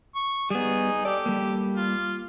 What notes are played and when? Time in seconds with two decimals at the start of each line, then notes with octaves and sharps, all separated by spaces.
0.15 C#6
0.50 G3 B3 D#4 G#4
1.05 G4 A4 D5
1.26 G3 A#3
1.76 F4